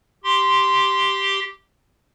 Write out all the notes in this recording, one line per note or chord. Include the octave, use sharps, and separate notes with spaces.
G4 C6